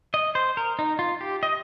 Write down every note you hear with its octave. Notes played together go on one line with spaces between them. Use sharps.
D#5
C5
A#4
D#4
F4
G4
D#5